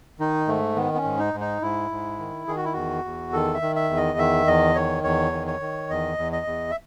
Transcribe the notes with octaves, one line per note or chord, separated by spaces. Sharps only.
D#3 D#4
G#2 A3
D#3 B3
B3
C#4
G#2
D#4
G#2
D#4
G#2 E4
G#2
D#3
D#3 G#4
F#4
E4
E2 F#4
E2
D#3 A4
E5
D#3
E5
E2
D#5
D#3 E5
E2 D#5
D#3 C#5
E2 C#5
D#3
C#5
D#3
E2 D#5
E2
D#5
E2
E5